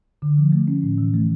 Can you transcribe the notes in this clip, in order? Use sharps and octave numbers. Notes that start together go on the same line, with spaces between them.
D3
F3
A3
C#4
A2
E3
A3